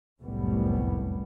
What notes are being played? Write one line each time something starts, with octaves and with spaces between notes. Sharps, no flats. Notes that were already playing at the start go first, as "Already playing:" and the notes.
F1 C2 F#2 A2 G3 B3